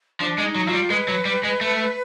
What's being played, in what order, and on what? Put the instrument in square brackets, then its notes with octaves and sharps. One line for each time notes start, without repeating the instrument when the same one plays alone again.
[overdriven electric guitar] F3 [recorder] D4
[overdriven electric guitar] G#3
[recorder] D#4
[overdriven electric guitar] F#3
[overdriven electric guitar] F#3 [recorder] F4
[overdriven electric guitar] G3
[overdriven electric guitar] G#3 [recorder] B4
[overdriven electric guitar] F#3
G3
G#3
A3